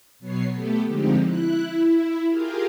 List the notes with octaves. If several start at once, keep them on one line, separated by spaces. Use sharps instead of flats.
B2 F#3 B3 C#5 C7
A3 B3 G4 A4
D3 F3 G#3 C4 D#4 G4
E4 F#6
E4
F4 G4 G#4 A#4 F5